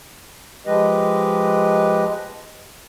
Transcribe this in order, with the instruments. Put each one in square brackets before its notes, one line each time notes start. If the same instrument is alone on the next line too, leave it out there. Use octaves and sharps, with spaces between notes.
[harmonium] F3 G#3 G4 B4 D#5